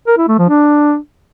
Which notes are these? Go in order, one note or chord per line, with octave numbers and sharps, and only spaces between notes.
A#4
E4
A3
F3
D4